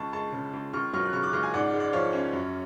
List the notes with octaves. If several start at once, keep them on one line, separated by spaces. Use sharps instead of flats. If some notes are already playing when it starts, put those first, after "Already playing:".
Already playing: C#2 A5 C#6
G#3 A5 C#6
C#3
C#2
C#2 C#6 F6
F#3 C#6 F6
F#6
C#3 C#6 F6
D6 F#6
C#2 C#6 F6
F5 G#5
G#2 D5 F#5
G#3
D5
F3 C#5 F5
C#4
F#2